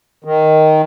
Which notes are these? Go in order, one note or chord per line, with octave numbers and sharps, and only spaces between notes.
D#3